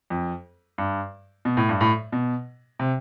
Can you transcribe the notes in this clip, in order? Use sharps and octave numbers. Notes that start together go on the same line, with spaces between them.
F2
G2
B2
A2
G2
A2
B2
C3